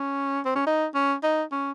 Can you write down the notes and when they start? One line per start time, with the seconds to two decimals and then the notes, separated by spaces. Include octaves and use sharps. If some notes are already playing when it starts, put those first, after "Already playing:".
Already playing: C#4
0.45 C4
0.55 C#4
0.66 D#4
0.95 C#4
1.23 D#4
1.52 C#4